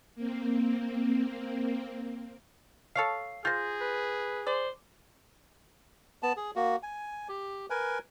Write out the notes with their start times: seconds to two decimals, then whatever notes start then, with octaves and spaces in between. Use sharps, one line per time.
0.15 A#3 C4
2.95 A4 C#5 F5 C7
3.45 F4 G#4 C5 G6 A#6
3.80 B4
4.47 C5 D5
6.23 B3 A5
6.37 G#4
6.56 A#3 F#4
6.83 G#5
7.28 G4
7.70 A#4 B4 G#5